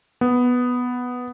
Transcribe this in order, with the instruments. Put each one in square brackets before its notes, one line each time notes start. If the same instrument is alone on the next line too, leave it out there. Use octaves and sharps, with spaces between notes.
[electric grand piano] B3